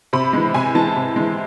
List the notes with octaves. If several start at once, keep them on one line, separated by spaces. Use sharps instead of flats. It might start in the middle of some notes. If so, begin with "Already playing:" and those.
C3 B5
E3 G#3
C3 G#5
E3 G#3 A5
C3
E3 G#3